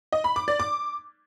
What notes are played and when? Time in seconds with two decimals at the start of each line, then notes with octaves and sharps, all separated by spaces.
0.12 D#5
0.24 B5
0.36 D6
0.48 D5
0.60 D6